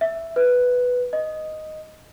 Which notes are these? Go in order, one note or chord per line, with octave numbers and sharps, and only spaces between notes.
E5
B4
D#5